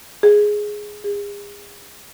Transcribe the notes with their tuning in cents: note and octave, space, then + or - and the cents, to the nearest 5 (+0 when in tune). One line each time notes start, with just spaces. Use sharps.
G#4 +5
G#4 -35